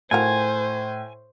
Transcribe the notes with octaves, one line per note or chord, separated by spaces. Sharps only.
A2 F3 F#4 A#4 C5 G#5